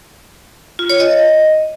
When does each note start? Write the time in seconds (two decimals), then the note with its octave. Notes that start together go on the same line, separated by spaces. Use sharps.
0.79 F4
0.90 C#5
1.00 D#5